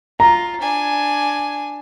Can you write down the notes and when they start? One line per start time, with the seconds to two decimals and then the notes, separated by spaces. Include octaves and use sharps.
0.20 F4 A#5
0.61 D4 G#5